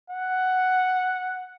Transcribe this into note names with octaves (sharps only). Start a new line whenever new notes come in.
F#5